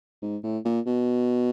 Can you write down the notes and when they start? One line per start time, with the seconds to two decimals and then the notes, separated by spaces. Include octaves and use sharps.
0.22 G#2
0.43 A2
0.65 A#2
0.86 B2